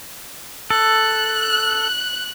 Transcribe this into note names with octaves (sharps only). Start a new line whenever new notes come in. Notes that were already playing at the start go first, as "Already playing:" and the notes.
A4 F#6